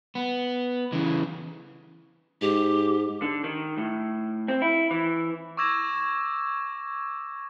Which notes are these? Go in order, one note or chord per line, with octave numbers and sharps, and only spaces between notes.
B3
C#3 E3
G#2 G4
D3
D#3
A2
C4
E4
E3
C#6 D6 E6 G#6 A#6 E7